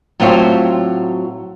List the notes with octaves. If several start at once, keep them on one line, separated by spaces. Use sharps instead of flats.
A2 F#3 C4 F4 G4 C#5